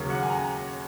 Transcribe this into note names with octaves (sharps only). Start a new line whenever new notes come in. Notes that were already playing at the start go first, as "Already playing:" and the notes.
Already playing: D#2 C#3 F#3 A#3 C#4
F#5
G#5
A#5